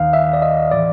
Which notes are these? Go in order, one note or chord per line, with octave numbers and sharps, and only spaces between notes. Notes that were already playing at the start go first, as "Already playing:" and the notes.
Already playing: D#2 D#3 F5
E5
D5
D#5
A2 E3 D5